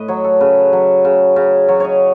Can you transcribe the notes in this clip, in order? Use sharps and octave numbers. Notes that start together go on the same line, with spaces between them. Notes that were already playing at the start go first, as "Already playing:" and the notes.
Already playing: A2 B4 D#5
F#3 C#5
A4
C#3 B4
F#3
C#3
C#3
F#3 C#5
C#5 D#5